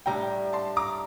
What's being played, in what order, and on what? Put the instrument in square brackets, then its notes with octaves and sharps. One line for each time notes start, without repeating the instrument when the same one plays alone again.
[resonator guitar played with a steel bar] A2 G3 D4 [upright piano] G5 A#5
[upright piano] A5 C6
A#5 D6